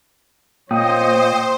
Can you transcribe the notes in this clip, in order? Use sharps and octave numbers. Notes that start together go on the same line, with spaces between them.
A#2 C5 C#5 D#5 G5 D#6